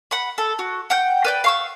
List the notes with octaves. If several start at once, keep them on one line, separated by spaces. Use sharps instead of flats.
F#5 B5
A4
F#4
F#5 G5 G6
B4 D5 G5
F5 C#6 E6